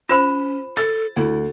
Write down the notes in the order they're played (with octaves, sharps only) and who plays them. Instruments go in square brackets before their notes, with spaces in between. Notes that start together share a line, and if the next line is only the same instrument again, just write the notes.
[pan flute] C#4 [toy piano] F4 C5 B5 [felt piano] E7
[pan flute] A4 [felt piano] A6
[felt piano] D2 [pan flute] E4